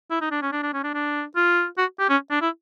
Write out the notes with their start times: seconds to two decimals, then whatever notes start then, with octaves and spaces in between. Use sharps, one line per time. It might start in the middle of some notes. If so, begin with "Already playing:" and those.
0.11 E4
0.21 D#4
0.31 D4
0.42 C#4
0.52 D4
0.63 D4
0.73 C#4
0.84 D4
0.94 D4
1.36 F4
1.78 F#4
2.00 G4
2.10 C#4
2.31 D4
2.42 E4